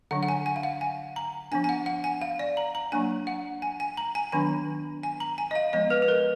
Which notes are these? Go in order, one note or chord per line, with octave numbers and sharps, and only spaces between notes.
D3 F#3 D4 F#5
F#5
G#5
G#5
F5
F#5
G#5
A#5
F3 B3 D4 G#5
G#5
F#5
F#5
G#5
F5
D5
A#5
A#5
F#3 A#3 D4 G#5
F#5
G#5
G#5
A#5
G#5
D#3 F#3 B3 D4 G#5
G#5
A#5
G#5
D#5
F5
F3 G#3 B3 D#5
B4
B4
A#4